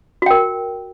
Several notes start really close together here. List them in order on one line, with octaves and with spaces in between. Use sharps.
F#4 G5 A#4